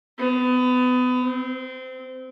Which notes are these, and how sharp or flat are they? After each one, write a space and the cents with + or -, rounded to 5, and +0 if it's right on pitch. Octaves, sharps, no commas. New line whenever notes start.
B3 +30
C4 -20